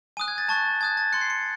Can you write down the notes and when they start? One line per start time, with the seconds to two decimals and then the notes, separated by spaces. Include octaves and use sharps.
0.17 G#5 D#6 F#6 D#7
0.28 G#6
0.38 A6
0.49 A5 C#6 F#6 A6
0.81 A5 D#6 F#6 G#6
0.97 A6
1.12 C6 F#6 C#7
1.21 C7
1.30 C#7